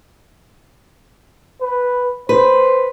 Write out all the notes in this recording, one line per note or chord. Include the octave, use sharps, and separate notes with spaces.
B4
B4 C5